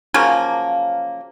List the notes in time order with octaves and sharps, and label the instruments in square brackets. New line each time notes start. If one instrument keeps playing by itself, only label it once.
[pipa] C#3 F3 F#3 A#3